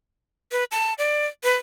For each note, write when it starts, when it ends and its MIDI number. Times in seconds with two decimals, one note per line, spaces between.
0.52 0.64 71
0.71 0.93 81
0.98 1.26 74
1.44 1.54 71